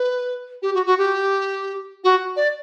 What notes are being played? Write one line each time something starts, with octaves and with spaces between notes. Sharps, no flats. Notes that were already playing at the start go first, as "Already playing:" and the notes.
Already playing: B4
G4
F#4
F#4
G4
F#4
D5